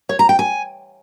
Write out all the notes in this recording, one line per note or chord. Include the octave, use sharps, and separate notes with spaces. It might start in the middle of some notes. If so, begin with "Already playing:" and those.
C#5
A#5
G5
G#5